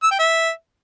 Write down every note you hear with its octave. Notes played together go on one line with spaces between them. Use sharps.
E6
G5
E5